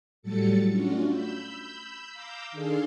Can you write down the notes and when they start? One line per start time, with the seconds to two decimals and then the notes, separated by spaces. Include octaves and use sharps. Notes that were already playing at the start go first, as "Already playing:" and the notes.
0.22 A2 F#3 G3 A4 A6 C#7
0.70 A3 C#4 D4 F4 F#4
1.08 B5 E6 G6
2.13 F5 A#5 D6 E6 G6
2.52 D#3 D4 G#4 A4 F5 C6